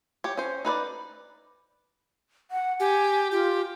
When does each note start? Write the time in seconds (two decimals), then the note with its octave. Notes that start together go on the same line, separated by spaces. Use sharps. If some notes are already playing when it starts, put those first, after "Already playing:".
0.24 G4 C#5
0.37 C#4 C5
0.65 D#4 B4 C5 D5
2.51 F#5
2.80 G4 G#5
3.31 F4 G4